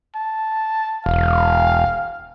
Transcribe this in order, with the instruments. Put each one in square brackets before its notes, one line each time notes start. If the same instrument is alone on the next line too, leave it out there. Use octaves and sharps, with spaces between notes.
[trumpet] A5
[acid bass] E1 [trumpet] F5